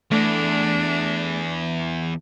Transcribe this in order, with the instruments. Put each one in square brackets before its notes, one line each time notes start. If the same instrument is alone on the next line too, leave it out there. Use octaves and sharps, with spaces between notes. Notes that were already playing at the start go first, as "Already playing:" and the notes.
[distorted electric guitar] E2 [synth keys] A3 [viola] D4